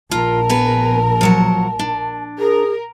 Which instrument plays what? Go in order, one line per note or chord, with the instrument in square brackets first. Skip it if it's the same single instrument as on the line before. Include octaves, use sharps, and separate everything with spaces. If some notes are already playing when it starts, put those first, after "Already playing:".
[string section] A#1 A#4 [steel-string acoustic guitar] F4 [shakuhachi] A5
[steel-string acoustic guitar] B3 G#4 B4
F3 F#3 F#5
D4
[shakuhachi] G#4 [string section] A#4